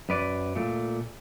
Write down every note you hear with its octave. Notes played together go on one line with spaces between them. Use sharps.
F#2 B4 D5
A#2 A3